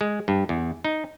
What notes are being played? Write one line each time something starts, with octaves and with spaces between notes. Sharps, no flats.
G#3
G2
E2
D#4